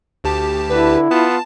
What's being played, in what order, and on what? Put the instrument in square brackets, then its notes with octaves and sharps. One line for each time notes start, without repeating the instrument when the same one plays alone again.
[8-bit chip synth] D2 G4 A5
[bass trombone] D3 [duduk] E4 [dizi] B4
[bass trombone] B3 [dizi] F4 [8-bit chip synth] A5